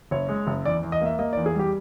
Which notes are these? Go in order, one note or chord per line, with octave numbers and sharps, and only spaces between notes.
F#1 C#5
G#3
F#1
E2 D5
E2
D#5
A#3 E5
A#3 D#5
E2 D5
G#4
G3 G4